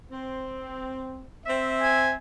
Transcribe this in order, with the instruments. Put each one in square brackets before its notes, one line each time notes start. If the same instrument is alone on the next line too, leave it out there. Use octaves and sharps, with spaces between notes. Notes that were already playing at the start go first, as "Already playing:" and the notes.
[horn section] C4
C4 E5
[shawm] G#5